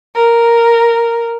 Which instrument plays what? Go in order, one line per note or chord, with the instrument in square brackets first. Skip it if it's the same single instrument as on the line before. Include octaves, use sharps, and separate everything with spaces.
[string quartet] A#4